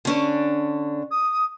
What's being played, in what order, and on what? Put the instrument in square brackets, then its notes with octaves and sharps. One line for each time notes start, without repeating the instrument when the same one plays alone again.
[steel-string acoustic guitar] D3 C#4 D4
[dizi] D#6